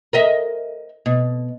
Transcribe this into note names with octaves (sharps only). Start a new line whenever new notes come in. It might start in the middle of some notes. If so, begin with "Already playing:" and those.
A#4 D#5 E5
B2